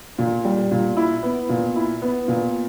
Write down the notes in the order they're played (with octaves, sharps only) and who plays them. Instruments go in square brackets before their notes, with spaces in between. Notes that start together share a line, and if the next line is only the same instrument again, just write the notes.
[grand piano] A#2
G3
A#2
E4
B3
A#2
E4
B3
A#2